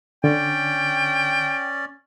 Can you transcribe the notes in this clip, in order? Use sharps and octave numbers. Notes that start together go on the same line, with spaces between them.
D3 C#4 D5 G5